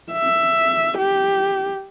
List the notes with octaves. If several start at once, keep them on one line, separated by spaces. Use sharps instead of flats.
E5
G4